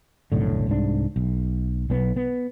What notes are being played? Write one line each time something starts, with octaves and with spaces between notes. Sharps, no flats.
F1 B1 A2 D3
C2 G#2 D4
B1
B1 B3
B3